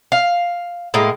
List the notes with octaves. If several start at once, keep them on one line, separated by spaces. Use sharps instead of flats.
F5
A2 G#3 A#3